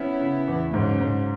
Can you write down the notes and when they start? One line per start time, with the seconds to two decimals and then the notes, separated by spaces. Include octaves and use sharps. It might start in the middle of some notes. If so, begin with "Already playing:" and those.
Already playing: B3 C#4 E4
0.21 C#3
0.48 E2
0.74 G#2 C#3 F#3
1.01 G#2